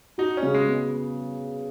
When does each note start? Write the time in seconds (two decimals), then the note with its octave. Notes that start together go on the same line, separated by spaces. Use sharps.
0.18 D#4 F#4
0.37 C#4
0.42 C#3
0.54 G#3
0.68 B3